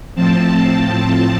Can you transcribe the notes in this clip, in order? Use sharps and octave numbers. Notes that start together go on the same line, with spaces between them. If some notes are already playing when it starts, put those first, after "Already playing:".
A2 F3 C4 A5